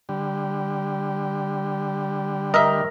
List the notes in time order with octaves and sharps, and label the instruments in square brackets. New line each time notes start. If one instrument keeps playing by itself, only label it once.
[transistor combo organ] D3 G3
[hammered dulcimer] A#4 [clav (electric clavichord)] D#5 E5